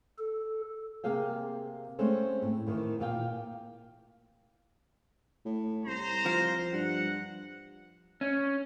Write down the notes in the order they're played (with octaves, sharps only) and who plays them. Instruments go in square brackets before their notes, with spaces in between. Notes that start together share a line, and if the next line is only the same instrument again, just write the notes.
[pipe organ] A4
[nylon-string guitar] C3 A#3 G#4 F5 G5
G#3 A3 C4 C#4 C5
A2
A2 D#3 E3
A#2 F5 G5
[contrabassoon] A2
[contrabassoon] C2 [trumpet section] C5 A#5
[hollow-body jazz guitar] F3
[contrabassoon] G2 [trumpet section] F#5
[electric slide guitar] C#4